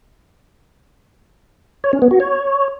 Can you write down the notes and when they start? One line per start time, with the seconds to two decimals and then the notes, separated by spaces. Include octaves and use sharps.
1.84 C#5
1.93 C#4
2.02 B3
2.11 F#4
2.20 C#5